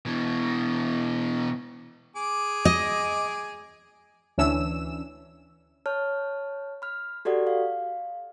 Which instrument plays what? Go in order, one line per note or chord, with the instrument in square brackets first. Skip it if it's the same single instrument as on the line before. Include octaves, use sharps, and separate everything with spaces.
[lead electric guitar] B2 E3
[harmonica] G#4 D6
[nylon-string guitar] D#5
[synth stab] D2 E3 C#4 D4 E6 E7
[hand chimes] C#5 A5 F6
B5 F6
F#4 G4 A4 D5 F#5
F5